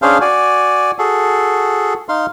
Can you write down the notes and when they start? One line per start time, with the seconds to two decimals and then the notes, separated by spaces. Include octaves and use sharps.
0.02 C#4 D4 G#4 C5 F5
0.21 F#4 D5 G#5
0.99 F#4 G#4 A4
2.09 D#4 F5 C6